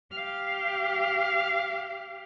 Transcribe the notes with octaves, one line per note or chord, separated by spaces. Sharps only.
G4 F5